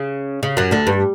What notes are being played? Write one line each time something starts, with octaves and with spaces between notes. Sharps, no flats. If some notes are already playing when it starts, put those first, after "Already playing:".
Already playing: C#3
C#3
F#2 F#3
D2 D3
G2